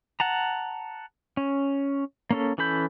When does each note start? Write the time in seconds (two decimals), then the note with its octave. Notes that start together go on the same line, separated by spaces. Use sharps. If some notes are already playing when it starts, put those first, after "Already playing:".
0.20 F#5 A5 A#5
1.37 C#4
2.31 A#3 C#4 A4
2.58 E3 C#4 A4 B5 G6